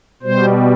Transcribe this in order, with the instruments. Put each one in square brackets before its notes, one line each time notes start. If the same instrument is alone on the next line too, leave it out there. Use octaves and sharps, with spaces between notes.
[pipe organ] B2 G3 C5